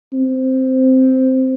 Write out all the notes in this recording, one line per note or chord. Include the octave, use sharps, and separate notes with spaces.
C4